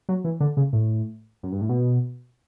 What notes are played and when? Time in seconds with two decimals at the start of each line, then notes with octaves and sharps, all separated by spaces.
0.09 F#3
0.24 E3
0.40 D3
0.57 C#3
0.73 A2
1.43 F#2
1.52 G2
1.61 A2
1.69 B2